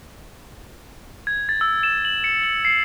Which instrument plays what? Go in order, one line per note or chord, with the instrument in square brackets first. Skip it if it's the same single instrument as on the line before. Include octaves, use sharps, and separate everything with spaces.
[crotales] G#6
A6
E6
E7
F#7
C#7
F#7
C7